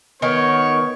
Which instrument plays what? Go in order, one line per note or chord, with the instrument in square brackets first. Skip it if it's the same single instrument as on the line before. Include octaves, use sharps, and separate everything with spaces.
[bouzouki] D#3 [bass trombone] B3 [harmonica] C#5